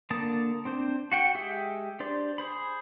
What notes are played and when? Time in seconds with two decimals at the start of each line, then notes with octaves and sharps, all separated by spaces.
0.10 D3 A#3 A5 D#6
0.65 C4 D4 C5
1.12 F#4 F#5 G5
1.35 G#3 G4 G#4 E5 G5
2.00 D4 G4 C5 D5
2.38 G#4 C5 B5